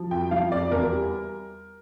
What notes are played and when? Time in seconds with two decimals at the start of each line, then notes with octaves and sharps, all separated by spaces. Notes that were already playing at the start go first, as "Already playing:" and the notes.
Already playing: F3
0.11 F2 G5
0.31 F3 F5
0.52 F2 D5
0.71 E2 A#4
0.91 G3